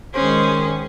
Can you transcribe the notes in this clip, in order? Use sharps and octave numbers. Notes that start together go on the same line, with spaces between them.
D#3 G#3 C#4 G#4 C5